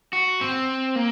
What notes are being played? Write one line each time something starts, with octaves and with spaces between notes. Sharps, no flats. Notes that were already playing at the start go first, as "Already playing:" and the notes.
F#4
C4
A#3